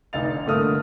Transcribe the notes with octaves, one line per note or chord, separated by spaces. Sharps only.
F1 D3 D#4 F5 A6 F7
G1 D3 A3 A#3 D#6 F6